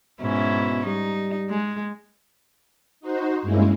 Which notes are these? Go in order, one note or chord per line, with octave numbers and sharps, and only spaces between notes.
G#2 B2 C#4 E4
G3 D#4
G#3
D#4 F#4 C5
G2 G#3 A#3 C#4 E4